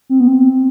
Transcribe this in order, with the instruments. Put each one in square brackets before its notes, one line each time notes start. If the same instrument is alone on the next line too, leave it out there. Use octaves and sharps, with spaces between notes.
[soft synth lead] C4
B3
C4